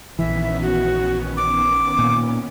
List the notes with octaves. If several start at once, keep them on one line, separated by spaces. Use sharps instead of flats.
A#1 D#3 E3 B3 C#4 E5
F#4
D6
A#2